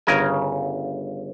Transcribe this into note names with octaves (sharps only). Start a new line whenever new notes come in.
G1 C#3 A#4 G#5